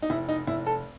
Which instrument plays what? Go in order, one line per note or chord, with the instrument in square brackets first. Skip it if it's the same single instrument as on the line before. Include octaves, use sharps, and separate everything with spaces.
[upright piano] D#4
F1 E4
D#4
F1 E4
A4